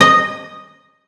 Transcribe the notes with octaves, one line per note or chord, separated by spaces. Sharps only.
D#5